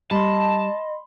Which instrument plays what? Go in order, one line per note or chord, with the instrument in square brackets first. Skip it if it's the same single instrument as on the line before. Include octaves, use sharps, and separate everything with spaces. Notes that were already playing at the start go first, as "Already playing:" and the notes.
[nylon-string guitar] G3 [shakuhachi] D#5 [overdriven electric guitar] A5 [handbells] B5 C6